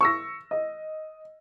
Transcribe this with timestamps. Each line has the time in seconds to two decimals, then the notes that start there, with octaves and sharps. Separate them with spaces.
0.01 C#6 E6 A#6
0.51 D#5